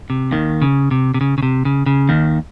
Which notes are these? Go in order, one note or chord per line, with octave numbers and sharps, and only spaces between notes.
C3
D#2 D#3
C#3
C3
C3
C#3
C#3
C3
C#3
C#3
D#2 D#3